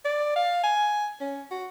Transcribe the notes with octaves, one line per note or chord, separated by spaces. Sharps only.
D5
F5
G#5
C#4
F#4